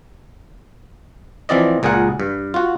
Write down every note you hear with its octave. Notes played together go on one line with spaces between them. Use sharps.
E3 F3 C4 F4 D5 D#5
C#2 A#2 G#4 A#4 F#5
G2
F4 F#4